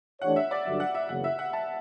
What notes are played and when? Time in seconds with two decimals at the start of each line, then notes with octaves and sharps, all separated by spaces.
0.21 E3 A3 D4 G4 C#5 F#5
0.36 E5
0.51 D5
0.66 G2 D3 F#3 E5
0.80 F#5
0.95 E5
1.09 F#1 E2 C#3 F#5
1.24 E5
1.39 F#5
1.53 A5